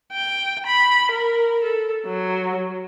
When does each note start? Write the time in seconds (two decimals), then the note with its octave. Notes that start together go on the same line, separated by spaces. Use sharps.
0.13 G5
0.66 B5
1.12 A#4
1.64 A4
2.07 F#3